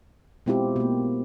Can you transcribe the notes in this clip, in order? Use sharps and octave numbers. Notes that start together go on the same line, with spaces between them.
B2 G#3 C4 E4 F4 G4
B2 A#3